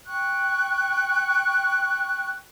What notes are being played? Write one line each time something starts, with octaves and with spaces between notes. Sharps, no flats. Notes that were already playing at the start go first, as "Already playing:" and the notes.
G5 C#6 F#6